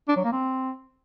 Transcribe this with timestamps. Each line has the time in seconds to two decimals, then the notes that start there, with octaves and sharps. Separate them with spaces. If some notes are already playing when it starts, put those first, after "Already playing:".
0.08 D4
0.16 F#3
0.24 A#3
0.32 C4